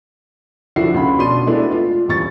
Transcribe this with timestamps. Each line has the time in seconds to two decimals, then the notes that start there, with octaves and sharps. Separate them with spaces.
0.76 D3 F3 E4 F#4 C7
0.94 C#2 B5
1.19 B2 D4 C6 D#7
1.47 G#3 A3 B3 D4 E4
1.71 F4
2.08 D#1 E2 C#6 A6